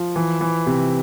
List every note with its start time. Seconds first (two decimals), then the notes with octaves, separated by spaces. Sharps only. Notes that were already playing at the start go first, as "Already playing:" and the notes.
Already playing: F3
0.16 E3
0.41 E3
0.66 C3